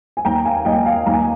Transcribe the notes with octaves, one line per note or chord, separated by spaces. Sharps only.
G#5
D#2 G5 A#5
F5 G#5
D#2 D#5 G5
F5 G#5
D#2 A#5
G#5